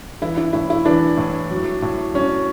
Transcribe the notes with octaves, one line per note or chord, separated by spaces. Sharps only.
E3 E4
E4
A2 E4
E4
E3 D4
A2
F#3
A2
F#3 C#4